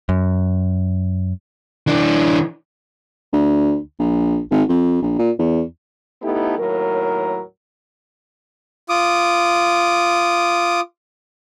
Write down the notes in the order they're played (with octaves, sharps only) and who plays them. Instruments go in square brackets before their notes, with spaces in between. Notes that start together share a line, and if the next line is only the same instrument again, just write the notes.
[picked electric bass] F#2
[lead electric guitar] E3 D4
[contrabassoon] D2
A#1
G#1
F2
A#1
A#2
E2
[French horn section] A3 B3 D#4 E4 G4 A4
D#2 A2 F#3 A#4
[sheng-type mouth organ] F4 D6 D#6